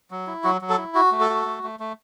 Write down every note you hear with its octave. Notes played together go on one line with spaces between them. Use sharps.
F#3
E4
F#3 F#4
F#3
A4
E4
F#4
A3
A4
F#4
A3
A3
A3